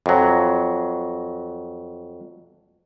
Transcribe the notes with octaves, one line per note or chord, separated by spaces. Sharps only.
F2 F#3